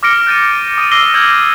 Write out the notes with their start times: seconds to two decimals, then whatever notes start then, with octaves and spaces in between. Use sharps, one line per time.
0.03 D6 F6 A#6 C#7 D7 G7
0.27 G6 A6 D#7
0.78 D#6 A6 D#7
0.92 D6 E6 A#6 C7 D#7 G7
1.14 E6 F6 G6 G#6 D#7 F#7